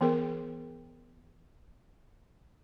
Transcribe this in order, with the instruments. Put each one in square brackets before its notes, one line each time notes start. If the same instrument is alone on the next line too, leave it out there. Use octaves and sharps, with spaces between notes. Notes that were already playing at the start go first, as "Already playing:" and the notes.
[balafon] E3 B3 G#4 A#4